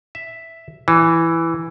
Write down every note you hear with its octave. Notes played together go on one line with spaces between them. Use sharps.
E5
E3